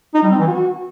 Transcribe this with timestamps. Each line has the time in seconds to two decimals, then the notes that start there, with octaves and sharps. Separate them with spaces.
0.14 D#4
0.23 G3
0.31 C4
0.39 E3
0.48 F#4